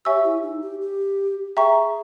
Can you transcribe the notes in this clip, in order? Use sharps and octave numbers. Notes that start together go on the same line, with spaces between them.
G4 C#5 E5 G#5 C#6 E6
E4
D#4
G4
G4
G#4 E5 G5 A#5 C#6